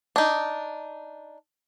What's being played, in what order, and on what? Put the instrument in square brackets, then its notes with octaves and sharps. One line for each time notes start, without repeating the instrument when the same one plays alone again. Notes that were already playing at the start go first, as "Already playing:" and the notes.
[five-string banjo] D4 D#4